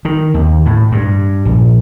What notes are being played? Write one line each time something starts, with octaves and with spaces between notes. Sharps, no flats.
D#3
D#2
A2
G2
A#1